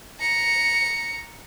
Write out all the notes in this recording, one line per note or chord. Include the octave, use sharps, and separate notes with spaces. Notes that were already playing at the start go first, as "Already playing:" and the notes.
A#5 C#7